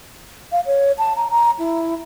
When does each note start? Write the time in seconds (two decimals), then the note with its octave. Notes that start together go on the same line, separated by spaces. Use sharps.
0.52 F5
0.66 C#5
0.98 A5
1.16 A#5
1.31 A#5
1.59 E4